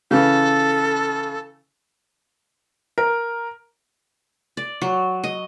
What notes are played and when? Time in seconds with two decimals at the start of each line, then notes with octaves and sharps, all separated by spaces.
0.11 C#3 E3 A4
2.98 A#4
4.57 D5
4.82 F#3
5.24 D#5